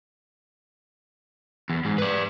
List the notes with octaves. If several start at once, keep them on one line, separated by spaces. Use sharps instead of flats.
E2
G#2
B4 D5